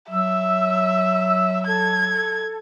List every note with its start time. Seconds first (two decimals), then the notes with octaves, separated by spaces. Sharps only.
0.10 F#3 E5 E6
1.67 A4 G#6